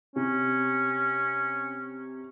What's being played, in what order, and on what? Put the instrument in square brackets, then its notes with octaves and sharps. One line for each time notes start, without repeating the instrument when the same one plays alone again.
[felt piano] C3 [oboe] C#4